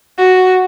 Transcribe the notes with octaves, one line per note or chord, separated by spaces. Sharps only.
F#4